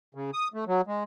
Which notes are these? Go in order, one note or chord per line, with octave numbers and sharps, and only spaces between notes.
C#3
D#6
A3
F#3
G#3